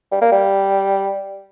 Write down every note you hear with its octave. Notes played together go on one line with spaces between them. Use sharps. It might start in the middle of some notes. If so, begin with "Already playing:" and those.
G3
A#3
G3